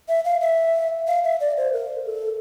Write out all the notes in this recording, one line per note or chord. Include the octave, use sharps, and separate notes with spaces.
E5
F5
E5
F5
E5
D5
C5
A#4
A4